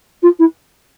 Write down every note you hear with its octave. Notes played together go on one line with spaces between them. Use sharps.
F4
E4